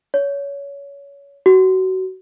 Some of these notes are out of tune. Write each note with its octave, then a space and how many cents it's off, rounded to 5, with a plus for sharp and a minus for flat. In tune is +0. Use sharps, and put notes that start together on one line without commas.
C#5 +20
F#4 +25